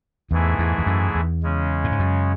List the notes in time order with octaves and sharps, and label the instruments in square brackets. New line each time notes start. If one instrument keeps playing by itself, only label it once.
[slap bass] E2 [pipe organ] G#2 E3 A3 E4 G#4
[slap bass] E2
E2
F#2
E2
[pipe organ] C#3 G#3 C#4
[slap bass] A2
G#2
F#2